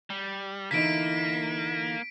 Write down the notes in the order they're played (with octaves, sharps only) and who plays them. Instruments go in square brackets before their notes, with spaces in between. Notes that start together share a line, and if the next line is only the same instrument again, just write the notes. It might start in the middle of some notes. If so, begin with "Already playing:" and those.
[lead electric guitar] G3
[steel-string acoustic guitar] D3 E3 D#4 [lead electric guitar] A#3 [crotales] B6 D7